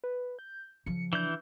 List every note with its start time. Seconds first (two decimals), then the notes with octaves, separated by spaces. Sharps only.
0.04 B4
0.39 G6
0.86 C#3 F3 C#7
1.13 E3 D4 G6